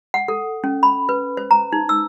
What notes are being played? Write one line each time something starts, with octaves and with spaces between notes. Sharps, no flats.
F#5
A4
C#4
B5
B4
C5
A#5
D#4
E6